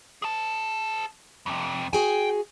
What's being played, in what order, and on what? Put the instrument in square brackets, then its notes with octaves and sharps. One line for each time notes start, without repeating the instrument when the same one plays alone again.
[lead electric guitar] G#4 A5
F2 C3
[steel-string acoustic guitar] F#4 G#4 G#5 [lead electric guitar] G5